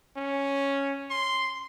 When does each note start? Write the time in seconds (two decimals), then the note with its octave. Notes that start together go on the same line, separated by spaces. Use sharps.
0.16 C#4
1.10 C6